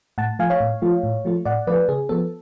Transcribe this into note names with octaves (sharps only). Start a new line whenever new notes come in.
A2 F#5 A5
F3 A3 F4 F5 G#5
C#5 F5
A2
F3 A3 F4
A2
F3 A3 F4
A2 D5 F#5
F3 A3 F4 B4 D5
C#3 G#4
F3 B3 A4